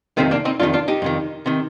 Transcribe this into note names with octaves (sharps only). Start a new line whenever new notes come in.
F2 C3 D#3 A3 C4
A#3 D4
C4 D#4
F2 C3 D#3 D4 F4
D4 F4
D#4 G4
F2 C3 D#3
C3 D#3